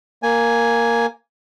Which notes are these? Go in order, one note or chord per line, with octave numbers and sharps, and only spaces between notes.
A#3 G#5